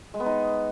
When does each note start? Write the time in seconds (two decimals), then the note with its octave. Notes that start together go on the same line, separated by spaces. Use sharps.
0.14 G#3
0.20 B3
0.26 D#4